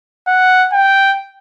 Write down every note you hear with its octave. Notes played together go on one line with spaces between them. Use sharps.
F#5
G5